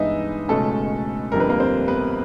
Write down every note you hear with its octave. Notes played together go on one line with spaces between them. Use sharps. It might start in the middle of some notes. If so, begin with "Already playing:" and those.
Already playing: G2 E3 G#3 B3 D#4 D#5 E5
C#2 B2 G#3 A3 C#4 A4
G1 F2 D3 G3 A#4
B4
A#3 A#4
C4 C5
B3 B4